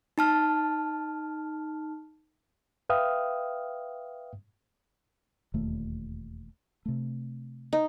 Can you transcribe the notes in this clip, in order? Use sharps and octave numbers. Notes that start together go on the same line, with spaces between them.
D#4 A5 F6
B4 E5 F5 G5 D#6 F6
E1 D#2 A3
C3 A3
D#4